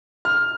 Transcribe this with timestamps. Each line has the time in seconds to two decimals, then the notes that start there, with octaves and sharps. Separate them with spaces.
0.25 F6